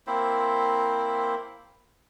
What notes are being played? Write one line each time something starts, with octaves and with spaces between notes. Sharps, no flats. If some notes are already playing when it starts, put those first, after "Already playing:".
A#3 C4 E4 C5